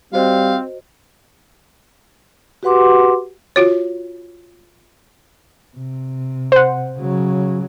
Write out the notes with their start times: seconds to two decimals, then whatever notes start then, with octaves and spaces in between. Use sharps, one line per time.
0.13 G3 C4 F#4 C5 D#5 F5
2.63 F#4 G4 B4 F#5 C6 D6
3.56 F4 F#4 C#5
5.76 C3
6.52 C5 F#5
6.99 C#3 F#3